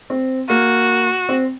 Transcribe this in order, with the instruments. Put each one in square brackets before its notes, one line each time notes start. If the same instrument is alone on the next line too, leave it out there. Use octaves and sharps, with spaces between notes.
[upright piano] C4
[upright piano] A#3 [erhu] F#4
[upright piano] C4